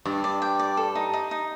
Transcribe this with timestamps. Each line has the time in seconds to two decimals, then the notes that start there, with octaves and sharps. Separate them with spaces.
0.05 G2 D5
0.24 D5
0.42 G5
0.59 D5
0.77 A4
0.95 D#4
1.13 D#4
1.31 D#4